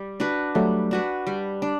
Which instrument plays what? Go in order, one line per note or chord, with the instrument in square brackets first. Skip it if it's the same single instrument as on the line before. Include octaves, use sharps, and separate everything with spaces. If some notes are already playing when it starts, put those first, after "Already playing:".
Already playing: [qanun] G3
D4 F#4 B4
[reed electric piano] F#3 A3 [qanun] G3
[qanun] D4 F#4 B4
G3
D4